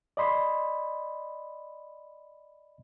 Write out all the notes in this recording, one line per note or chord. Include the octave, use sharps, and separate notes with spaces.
D5 D#5 B5 C6